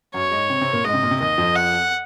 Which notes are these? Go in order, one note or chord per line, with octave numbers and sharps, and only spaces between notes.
F#2 F#3 C#5
G#2 G#3
C3 C4
C3 C4
A#2 A#3
G#2 G#3 D#5
C3
A#2
C3
D#2 D#3 D#5
F2 F3
F#5